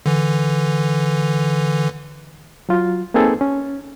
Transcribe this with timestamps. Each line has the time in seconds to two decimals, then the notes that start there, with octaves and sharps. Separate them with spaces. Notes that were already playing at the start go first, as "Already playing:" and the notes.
0.06 D3 E3
2.69 F#3 F4
3.14 A#3 C4 D#4 G#4 A4 B4
3.41 C#4